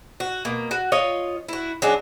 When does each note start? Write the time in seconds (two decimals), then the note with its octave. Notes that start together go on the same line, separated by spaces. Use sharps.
0.20 F#4
0.45 B2 A#3
0.71 F#4
0.92 F4 C#5 D#5
1.49 E4 F#4
1.82 F#3 G#3 C#4 D4